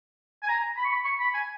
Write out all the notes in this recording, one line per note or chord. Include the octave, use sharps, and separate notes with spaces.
G#5
A#5
B5
C#6
B5
C#6
B5
G#5